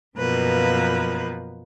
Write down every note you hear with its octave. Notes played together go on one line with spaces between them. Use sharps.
F#2 B2 F3 A#3 B4